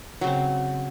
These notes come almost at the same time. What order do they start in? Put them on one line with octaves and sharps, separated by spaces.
F#3 C#3 C4